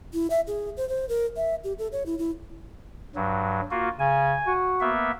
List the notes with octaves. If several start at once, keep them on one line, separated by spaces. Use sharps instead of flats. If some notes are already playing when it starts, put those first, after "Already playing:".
E4
E5
G#4
C5
C5
A#4
E5
G4
A4
C#5
E4
E4
G2 F#3
A#3 F4 F#4
C#3 G#5
F#4
A#3 B3 E5